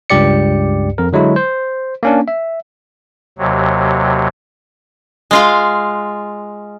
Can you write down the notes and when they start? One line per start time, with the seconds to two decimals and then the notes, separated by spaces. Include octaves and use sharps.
0.10 C#2 G2 G4 D5 C#7
0.98 F2 A#4
1.13 D3 F#3 G#3 E4
1.36 C5
2.03 A#3 C#4 D4
2.28 E5
3.38 D#2 C3 F#3
5.31 G#3 F4 F5